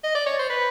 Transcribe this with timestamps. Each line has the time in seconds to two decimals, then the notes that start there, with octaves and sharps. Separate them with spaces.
0.04 D#5
0.15 D5
0.27 C#5
0.39 C5
0.50 B4